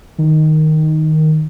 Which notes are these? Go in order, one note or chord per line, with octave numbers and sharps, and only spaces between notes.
D#3